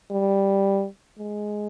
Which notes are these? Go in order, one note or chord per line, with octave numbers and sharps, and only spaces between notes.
G3
G#3